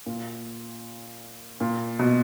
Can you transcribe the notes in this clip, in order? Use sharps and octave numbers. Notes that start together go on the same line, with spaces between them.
A#2
A#2
B2